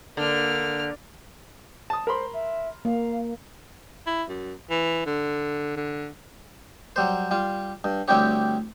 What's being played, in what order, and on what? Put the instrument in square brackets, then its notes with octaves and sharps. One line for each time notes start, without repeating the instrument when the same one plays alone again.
[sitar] D3 [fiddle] A#3 F6
[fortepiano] A5 D#6
[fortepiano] A#4 B5 C6 [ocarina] C5
[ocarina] E5
[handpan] A#3 [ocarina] F5
[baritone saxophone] E4
F#2
E3
D3
D3
[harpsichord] F#3 G3 C5
G3 F4
G2
D2 G3 C4 E4 G4 C#5